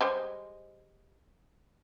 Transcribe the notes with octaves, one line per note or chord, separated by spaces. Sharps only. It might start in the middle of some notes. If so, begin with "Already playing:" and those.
G3 G#3 C5